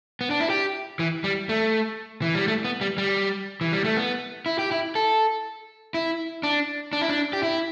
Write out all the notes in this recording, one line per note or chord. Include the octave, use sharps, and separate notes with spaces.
B3
D4
E4
G4
E3
G3
A3
E3
G3
A3
B3
G3
G3
E3
G3
A3
B3
E4
G4
E4
A4
E4
D4
D4
E4
D4
G4
E4